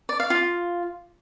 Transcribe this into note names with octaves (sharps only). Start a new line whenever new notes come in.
D5
F5
F4